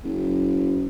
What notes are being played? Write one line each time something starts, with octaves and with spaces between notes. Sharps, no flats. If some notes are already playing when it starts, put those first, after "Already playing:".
F#1